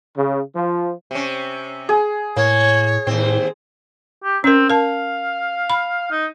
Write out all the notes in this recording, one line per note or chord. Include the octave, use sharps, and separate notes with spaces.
C#3
F3
C3 C#4
G#4
A2 A#3 C#5
D#2 A2 C4
G4
C4 C#4 A#4
A#4 F5 A5
B5
D#4